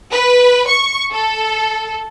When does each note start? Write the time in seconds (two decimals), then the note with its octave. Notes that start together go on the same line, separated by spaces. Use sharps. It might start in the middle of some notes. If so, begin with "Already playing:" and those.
0.12 B4
0.69 C#6
1.12 A4